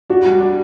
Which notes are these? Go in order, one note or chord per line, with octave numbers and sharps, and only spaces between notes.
D4 F#4
G3
D4